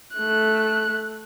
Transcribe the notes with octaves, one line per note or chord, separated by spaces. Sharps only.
A3 F#6